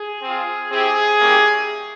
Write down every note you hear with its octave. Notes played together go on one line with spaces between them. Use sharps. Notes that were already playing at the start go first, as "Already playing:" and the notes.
Already playing: G#4
C4
F4
C4 E4 G4 G#4
G3 A#3 C#4 E4 G4